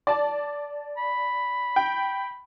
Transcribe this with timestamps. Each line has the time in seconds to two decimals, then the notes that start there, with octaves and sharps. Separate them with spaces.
0.07 D5 A5
0.97 B5
1.76 G5